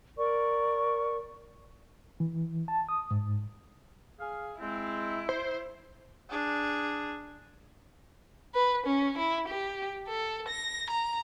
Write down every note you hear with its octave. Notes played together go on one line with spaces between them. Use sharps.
A#4 D5 C#6
E3
A5
D#6
G#2
G#4 F5
G#3 C4 E4
C5
D4 G#4
B4
C#4
E4
G4
A4
A#6
A#5